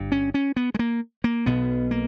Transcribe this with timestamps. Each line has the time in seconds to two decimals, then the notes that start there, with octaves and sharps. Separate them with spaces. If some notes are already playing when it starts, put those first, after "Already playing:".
Already playing: G1 G2
0.12 C#4
0.34 C#4
0.56 B3
0.74 G#3
0.79 A#3
1.24 A#3
1.46 B1 B2 B3
1.91 A#3